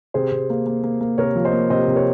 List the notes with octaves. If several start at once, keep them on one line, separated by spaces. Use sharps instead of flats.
C3 G#4 C5
C3
A#3
A#3
A#3
A#3
C3 A#4 C#5
F3
C5 D#5
A#3
C3 C5 D#5
C3
A#4 C#5